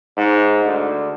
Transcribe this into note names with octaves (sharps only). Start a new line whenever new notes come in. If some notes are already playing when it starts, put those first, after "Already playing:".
G#2
D2